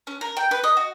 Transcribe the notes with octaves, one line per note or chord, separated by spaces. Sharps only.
C#4
A#4
G5
B4
D#5
F#4